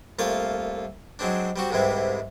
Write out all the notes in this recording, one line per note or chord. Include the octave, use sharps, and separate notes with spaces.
C2 A3 A#3 F4 F5
F#3 G#3 C4 D4
G3 C4 F#4
C2 G#2 C3 E3 G3 G#3